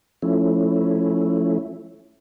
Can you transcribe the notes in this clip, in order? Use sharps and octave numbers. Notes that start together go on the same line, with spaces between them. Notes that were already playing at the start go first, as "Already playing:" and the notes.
F3 A3 C#4 E4